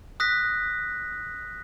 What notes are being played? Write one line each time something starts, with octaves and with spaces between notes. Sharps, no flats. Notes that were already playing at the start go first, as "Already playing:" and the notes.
D#6 F#6 A#6 B6